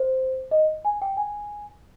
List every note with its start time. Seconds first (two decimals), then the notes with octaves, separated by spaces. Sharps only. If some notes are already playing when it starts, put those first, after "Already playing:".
Already playing: C5
0.51 D#5
0.85 G#5
1.02 G5
1.17 G#5